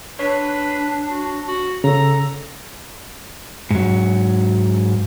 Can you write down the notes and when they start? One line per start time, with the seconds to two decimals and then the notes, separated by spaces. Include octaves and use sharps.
0.19 D4 B4 C#5
1.10 F#4
1.48 F#4
1.84 C#3 A4 A#5
3.71 G#2 F#3